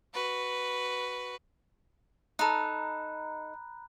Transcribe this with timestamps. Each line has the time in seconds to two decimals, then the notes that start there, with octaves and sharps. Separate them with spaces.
0.14 F#4 B4
2.39 D#4 A4 A#5 B5 F#6